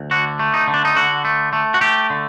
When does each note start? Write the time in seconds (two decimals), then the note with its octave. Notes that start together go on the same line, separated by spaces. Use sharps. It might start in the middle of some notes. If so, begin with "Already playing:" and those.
Already playing: D2
0.11 D3 F#4
0.39 A3
0.54 D#4
0.68 D3
0.74 D4
0.85 D#4
0.96 D3 F#4
1.25 A3
1.53 A3
1.74 F#4
1.81 A3 G4
2.10 D3